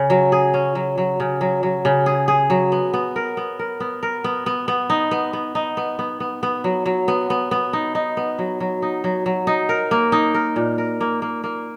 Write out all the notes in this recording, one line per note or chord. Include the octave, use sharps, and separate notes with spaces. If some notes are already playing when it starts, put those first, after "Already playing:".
Already playing: C#3
F#3
G#4
C#4
F#3
F#3
C#3
F#3
F#3
C#3
G#4
G#4
F#3
B3
B3
A#4
B3
A#4
B3
A#4
B3
B3
B3
D#4
B3
B3
D#4
B3
B3
B3
B3
F#3
F#3
B3
B3
B3
D#4
D#4
B3
F#3
F#3
D#4
F#3
F#3
D#4
A#4
A#3
D#4
A#4
A#2
A#4
A#3
A#3
A#3